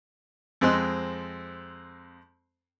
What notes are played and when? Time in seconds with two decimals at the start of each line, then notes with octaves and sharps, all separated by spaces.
0.61 F2 G#3 C4 D#5 C6 F#6